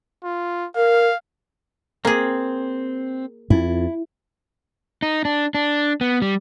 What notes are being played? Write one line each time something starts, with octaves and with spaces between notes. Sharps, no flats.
F4
A#4 F5
A#3 C4 G#4
F2 E4
D#4
D4
D4
B3
G3